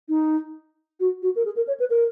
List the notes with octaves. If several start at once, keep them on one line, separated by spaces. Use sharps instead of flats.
D#4
F#4
F#4
A#4
G#4
A#4
C#5
B4
A#4